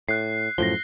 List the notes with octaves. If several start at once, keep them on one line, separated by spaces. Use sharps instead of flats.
A2 F#6 C7
F#2 A2 F3 A#6 G7